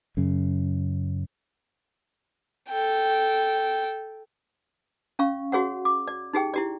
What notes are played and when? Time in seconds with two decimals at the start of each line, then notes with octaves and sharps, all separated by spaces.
0.17 F#2 C#3
2.69 A4 G5
5.19 C#4 F5 C#6
5.52 F#4 G#4 C#5 F#5
5.85 D6
6.08 D5
6.33 D#4 G4 G#4 G5
6.54 E4 G4 D5